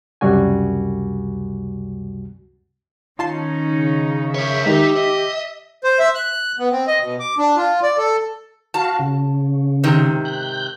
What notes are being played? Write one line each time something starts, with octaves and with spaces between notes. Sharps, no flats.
C#2 F#2 C3 G3 F#4 G#5
D#3 C#4 D#4 F4 A5 C6
C#3
A#4 C#5 E5
D#3 G#3 D#4 G4
D#5
C5
E5
F#6
B3
C4
D#5
B2
D6
D4
F4
D5
A4
F#4 F5 A5
C#3
G#2 C3 D#3
F#6 G6